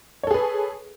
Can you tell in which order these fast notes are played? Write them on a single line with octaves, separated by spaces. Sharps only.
C#5 A4 G#4 B4